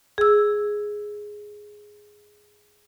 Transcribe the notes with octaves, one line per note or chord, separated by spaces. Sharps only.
G#4 E6